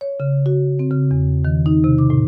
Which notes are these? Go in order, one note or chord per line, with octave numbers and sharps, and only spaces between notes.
C#5
C#3
F#4
C4
C#3
E2
D#3
D#4
C3
D6
A2